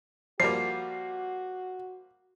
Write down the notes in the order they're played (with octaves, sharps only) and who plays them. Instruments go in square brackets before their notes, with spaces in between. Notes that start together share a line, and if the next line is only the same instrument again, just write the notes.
[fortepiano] F3 G3 A#3 [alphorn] F#4 [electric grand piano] C7